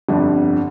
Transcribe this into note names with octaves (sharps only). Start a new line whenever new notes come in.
G1 F2 D3 G3